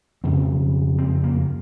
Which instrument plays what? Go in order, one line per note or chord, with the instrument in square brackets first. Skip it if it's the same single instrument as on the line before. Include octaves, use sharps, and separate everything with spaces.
[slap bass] F2 C#3 C4
C4
A#3